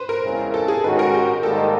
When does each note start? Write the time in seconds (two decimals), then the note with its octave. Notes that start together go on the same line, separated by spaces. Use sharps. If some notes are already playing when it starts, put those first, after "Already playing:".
Already playing: B4 C5
0.09 A#4
0.24 E2 C#3 E3 G#3 C4
0.54 A4
0.68 G#4
0.84 G#2 D#3 G#3 C#4 F#4 B4
0.99 A#4
1.14 G4
1.43 G#2 D#3 G3 A#3 D#4 A4